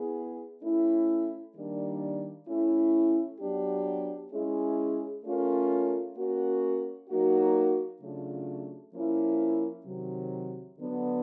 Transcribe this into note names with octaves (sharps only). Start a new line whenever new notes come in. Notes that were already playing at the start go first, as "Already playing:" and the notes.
Already playing: B3 E4 G#4
A3 C#4 E4
D#3 G3 A#3 D4
A3 C#4 E4
F#3 B3 D4 G4
G#3 C#4 E4 G#4
A3 C#4 F4 A#4
A#3 C#4 F#4
F#3 A#3 D#4 F#4
C#3 F#3 A3 D4 F4
F3 A#3 C#4 E4
C3 D#3 F#3
D3 F#3 B3 D4